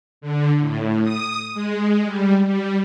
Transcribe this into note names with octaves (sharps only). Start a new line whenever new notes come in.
D3
A2
D#6
G#3
G3
G3